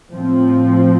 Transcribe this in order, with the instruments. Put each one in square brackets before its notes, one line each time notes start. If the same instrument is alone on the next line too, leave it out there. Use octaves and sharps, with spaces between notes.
[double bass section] A2 F3 C4